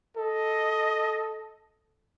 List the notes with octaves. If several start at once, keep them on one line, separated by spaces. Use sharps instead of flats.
A4 D#5